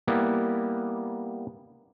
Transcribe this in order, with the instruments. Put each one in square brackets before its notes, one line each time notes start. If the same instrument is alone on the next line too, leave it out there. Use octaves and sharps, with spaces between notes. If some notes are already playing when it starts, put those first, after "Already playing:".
[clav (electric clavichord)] G3 A#3 B3 E4